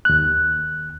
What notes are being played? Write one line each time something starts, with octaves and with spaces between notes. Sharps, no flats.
D#2 F#6